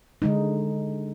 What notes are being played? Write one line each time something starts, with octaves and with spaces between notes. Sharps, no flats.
D3 G#3 D#4